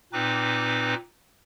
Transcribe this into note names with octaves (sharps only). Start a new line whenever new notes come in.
A#2 C4 D#4 B4 D6